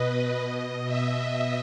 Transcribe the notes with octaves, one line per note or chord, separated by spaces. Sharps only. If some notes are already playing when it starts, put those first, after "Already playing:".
Already playing: B2 B4 D#5
B2 D#5
E5